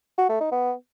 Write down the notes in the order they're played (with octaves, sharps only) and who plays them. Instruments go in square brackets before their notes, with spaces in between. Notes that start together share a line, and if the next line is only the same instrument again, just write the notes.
[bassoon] F#4
A3
D#4
B3